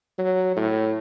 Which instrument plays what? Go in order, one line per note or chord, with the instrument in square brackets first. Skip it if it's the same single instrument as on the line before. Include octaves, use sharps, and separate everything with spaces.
[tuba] F#3
A2